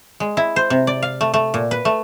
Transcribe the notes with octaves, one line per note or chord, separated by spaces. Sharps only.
G#3
E4
C5
C3
D5
F5
A3
A3
A#2
B4
A3